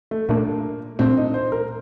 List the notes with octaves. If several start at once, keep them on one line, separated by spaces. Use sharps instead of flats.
A3
A#2 A3 A#3 D4
A#2 A3 C4 D4
D#4
C5
A#4